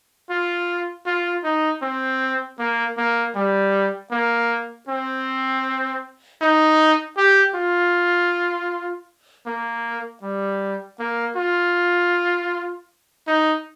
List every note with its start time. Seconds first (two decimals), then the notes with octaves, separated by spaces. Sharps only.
0.30 F4
1.06 F4
1.44 D#4
1.82 C4
2.59 A#3
2.98 A#3
3.35 G3
4.11 A#3
4.89 C4
6.41 D#4
7.17 G4
7.55 F4
9.46 A#3
10.22 G3
11.00 A#3
11.37 F4
13.28 D#4